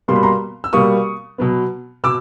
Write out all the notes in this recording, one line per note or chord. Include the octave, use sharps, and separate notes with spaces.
B2 G3 A#3 C6
B5
A#5 C6
E6
B2 G3 A#3 C#6 D#6
B2 F#3 B3
B2 D6 E6